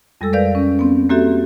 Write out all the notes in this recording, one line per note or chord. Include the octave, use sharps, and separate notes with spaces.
F2 G3 G#3 A4 E6
A#4 B4 D5 F5 G6
C#4
B3 C4
A#3 C4 F#4 G4 A4 E5